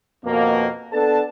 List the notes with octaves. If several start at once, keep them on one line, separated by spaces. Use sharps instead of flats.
F2 B2 A#3
B3 D4 A4 A5